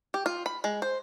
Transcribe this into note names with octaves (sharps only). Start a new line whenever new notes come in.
G4
F4
B5
G#3
C5